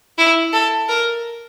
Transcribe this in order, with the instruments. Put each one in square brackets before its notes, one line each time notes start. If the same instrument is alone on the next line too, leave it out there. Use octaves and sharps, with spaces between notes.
[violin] E4
A4
A#4